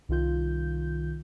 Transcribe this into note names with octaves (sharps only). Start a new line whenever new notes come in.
C2 D#3 F4 G6